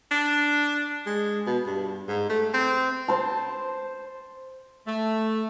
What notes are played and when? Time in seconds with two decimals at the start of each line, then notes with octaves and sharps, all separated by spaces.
0.11 D4
1.06 G#3
1.46 B2
1.67 G2
2.08 G#2
2.30 A3
2.54 C4
3.08 C5 A5
4.87 A3